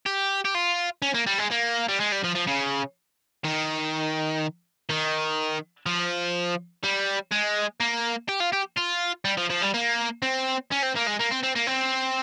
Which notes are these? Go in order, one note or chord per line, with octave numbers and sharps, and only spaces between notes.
G4
G4
F4
C#4
A#3
G3
G#3
A#3
G3
G#3
G3
F3
F3
C#3
D#3
D#3
F3
G3
G#3
A#3
G4
F4
G4
F4
G3
F3
F3
G3
A#3
C4
C#4
C4
A#3
G#3
A#3
C4
C4
A#3
C4